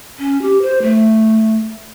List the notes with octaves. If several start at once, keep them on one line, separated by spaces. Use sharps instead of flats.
C#4
G4
C5
A3